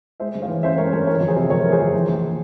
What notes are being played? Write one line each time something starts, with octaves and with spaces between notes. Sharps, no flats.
G#3 C5 E5
G2
C#5 F5
E3
C#4 C5 E5
G#3 A#4 C#5
G2 A#4 C#5
E3 A#4 C#5
F2
G#4 C5
C3
F2 A#4 C#5
E3 A#4
G#4 C5
F2
E3
A#1